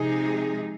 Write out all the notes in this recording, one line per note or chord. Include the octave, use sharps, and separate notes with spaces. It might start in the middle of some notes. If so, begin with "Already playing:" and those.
Already playing: C3 F3 G#3 D#4 G#4